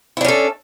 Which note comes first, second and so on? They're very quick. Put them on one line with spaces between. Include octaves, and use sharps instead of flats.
E4 D4 C#4 A4